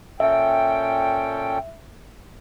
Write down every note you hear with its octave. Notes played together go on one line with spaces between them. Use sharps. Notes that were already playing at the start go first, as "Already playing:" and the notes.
A#2 C#4 A4 E5 G5